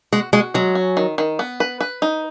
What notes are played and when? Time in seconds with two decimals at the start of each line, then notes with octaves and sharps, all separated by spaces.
0.12 G#3 F#4
0.33 G#3 F#4
0.54 F#3 G#3
0.75 C#4
0.97 D#3
1.18 D#3
1.39 B3
1.60 B4
1.80 B4
2.02 D#4